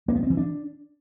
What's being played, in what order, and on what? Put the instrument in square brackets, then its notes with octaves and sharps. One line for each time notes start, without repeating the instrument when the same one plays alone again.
[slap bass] A#3
B3
C4
E3
D4